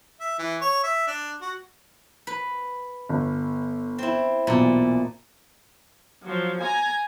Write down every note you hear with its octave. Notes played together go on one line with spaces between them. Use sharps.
E5
E3
C#5
E5
D4
F#4
B4
G1
C4 E4
B1 E2 A#2 A4
F3 F#3
G#5 A#5